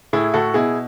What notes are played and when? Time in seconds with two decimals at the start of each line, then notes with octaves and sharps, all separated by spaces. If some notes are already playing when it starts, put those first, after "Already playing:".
0.13 A2 E4 G#4
0.34 A2 F#4 A4
0.54 B2 E4 G#4